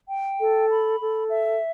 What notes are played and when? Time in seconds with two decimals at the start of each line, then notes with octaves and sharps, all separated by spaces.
0.10 G5
0.40 A4
0.70 B5
1.00 A4
1.31 E5